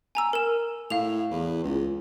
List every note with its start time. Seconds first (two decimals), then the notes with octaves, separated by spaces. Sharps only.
0.15 G#5 A#5 E6
0.33 A#4 E7
0.90 A2 F5 F7
1.31 E2
1.64 C#2